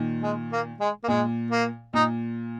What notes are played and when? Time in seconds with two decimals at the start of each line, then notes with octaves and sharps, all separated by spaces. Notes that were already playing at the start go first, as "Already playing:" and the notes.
Already playing: A#2 D#3
0.23 G#3
0.52 A#3
0.80 G#3
1.04 A#3
1.08 A#2 G#3
1.51 A#3
1.94 A#2 D#4